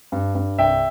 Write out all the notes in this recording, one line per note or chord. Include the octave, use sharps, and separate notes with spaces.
G2
G2
C2 E5 G5